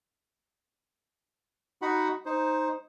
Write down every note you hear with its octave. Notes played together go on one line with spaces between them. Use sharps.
D#4 F#4 F#5 B5
D#4 C5